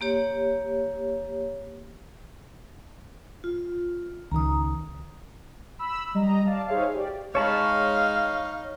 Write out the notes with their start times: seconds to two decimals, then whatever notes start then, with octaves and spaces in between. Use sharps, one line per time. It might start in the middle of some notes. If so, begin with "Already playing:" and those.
0.01 A#3 G4 C#5
3.44 F4
4.31 C#2 D#3 A#5 D#6
5.79 B5 E6
6.15 G3 D#5 A#5
6.46 D5 F5 A5
6.67 D#4 G#4 C5 C#5 E5 F5
6.94 G4 D5
7.35 G#3 D#4 C#5 F5 A5 B5